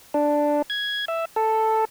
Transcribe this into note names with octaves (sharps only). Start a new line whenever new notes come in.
D4
G#6
E5
A4